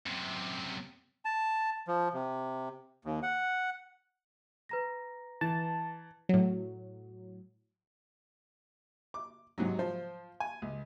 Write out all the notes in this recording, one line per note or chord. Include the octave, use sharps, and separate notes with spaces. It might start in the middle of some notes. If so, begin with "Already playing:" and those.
F#2 C3
A5
F3
C3
D#2
F#5
B4 A#5 A#6
E3 A5
A2 F#3
D6
G#2 C3 F#3
F3 C5
G#5
C#2